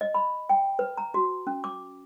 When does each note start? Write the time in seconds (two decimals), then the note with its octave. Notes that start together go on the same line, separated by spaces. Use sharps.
0.01 D#5
0.14 B5
0.49 G5
0.79 B4
0.97 A#5
1.14 F#4
1.47 C#4
1.64 D6